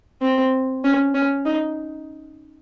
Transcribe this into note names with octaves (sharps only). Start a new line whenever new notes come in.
C4
C#4
C#4
D#4